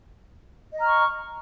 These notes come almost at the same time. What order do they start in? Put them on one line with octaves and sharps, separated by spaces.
D#5 A#5 F6 C#6